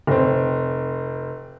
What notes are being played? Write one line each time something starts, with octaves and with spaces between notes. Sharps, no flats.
F1 C4